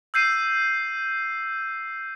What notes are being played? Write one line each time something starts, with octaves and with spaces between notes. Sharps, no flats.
E6 G6 C7 D#7